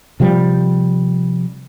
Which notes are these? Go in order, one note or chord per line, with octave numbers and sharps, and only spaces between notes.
C3 F3 G3